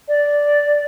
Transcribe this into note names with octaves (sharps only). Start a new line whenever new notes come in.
D5